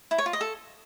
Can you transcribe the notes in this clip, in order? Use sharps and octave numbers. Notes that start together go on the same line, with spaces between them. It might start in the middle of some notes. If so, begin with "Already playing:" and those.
E4
C#5
F4
D#5
A4